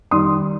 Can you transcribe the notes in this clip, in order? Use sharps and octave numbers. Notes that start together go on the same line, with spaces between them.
D#3 G3 C6 D#6